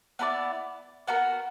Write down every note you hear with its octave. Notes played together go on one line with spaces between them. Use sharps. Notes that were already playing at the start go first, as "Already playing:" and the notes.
B3 E4 A#4 D5
B3 F#4 A#4